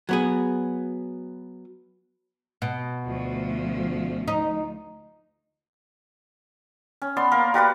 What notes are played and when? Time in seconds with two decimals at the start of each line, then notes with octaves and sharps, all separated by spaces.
0.09 F#3 B3 G#4
2.62 B2
3.05 D2 F3
4.28 D#4
7.02 C#4
7.17 B3 D5 C6
7.31 A#3 A#4
7.54 G3 F#4 B4 D5